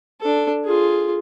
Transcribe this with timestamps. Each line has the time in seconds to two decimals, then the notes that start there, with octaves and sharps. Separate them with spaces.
0.21 D4 A4
0.65 F4 G#4